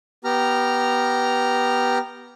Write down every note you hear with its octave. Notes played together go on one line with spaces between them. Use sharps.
B3 G4 A#5 F6